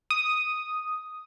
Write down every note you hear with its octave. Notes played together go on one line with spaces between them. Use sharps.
D#6